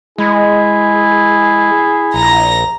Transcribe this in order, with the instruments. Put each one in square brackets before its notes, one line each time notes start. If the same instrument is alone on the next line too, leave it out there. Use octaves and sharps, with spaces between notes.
[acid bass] G#3 [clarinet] E4 [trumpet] G#4
[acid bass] A#1 [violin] A#5 A#6